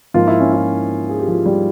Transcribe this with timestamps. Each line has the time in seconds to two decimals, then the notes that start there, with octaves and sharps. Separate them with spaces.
0.14 G#2 F3 A#3 F4
0.28 E4
0.40 C#4
0.53 E4
1.10 G#4
1.19 G4
1.27 F3 F4
1.46 G3 G4